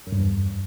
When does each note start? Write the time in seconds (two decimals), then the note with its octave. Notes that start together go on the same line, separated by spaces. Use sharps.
0.07 F#2
0.12 G2
0.18 E2
0.24 G2